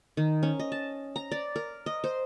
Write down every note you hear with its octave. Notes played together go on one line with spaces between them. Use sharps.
D#3
C#4
D#5
A5
A#5
D5
A#4
D#5
C5